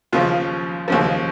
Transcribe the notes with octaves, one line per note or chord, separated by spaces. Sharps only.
D#2 C#3 F3 F4
D#2 C#3 F3